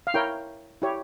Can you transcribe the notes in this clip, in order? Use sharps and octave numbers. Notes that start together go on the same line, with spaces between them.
F5
E4 A#4 C#5 G5
E4 G4 C#5